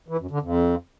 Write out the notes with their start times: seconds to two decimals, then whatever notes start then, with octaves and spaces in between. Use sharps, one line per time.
0.08 E3
0.20 F#2
0.31 D3
0.42 F2